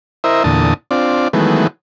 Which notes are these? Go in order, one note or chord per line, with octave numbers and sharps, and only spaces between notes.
E4 A#4 C5 D#5 E5
E2 A#2 D3 A5 D#6
C4 D4 F4 D5
D#3 E3 F#3 G#3 A3 B3